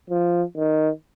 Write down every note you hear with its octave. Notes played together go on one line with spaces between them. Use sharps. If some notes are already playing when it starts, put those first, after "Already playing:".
F3
D#3